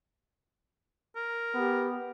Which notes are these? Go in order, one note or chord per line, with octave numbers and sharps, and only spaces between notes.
A#4
B3 G4